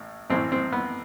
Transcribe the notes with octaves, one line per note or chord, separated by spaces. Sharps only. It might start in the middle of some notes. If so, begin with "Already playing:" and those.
Already playing: A1 A2
A1 A2 E3 C4
C4
B3